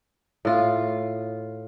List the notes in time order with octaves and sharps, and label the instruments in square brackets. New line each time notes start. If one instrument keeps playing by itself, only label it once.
[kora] A2 F4